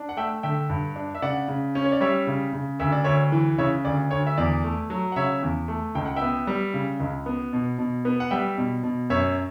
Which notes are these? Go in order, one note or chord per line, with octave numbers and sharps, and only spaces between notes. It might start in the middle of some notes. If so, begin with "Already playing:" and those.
Already playing: D4
F#5
A3 E5 G5
D3 E5 G5
G2
D4
E5
C#3 D5 F#5
C#3
C#4
C#5
D5
G3 C#5 E5
C#3
C#3
D2 E5
D5
D2 C#5 E5
E3
C#3 C#5 E5
D2 D5
D2 C#5
E5
E2 D5
A3
F#3
F#5
C#3 C#5 E5
E2
A3
C#2 G5
F#5
E5 G5
B3
G3
C#3
C#2
B3
B2
B2
B3
F#5
G3 E5 G5
B2
B2
F#2 C#5 E5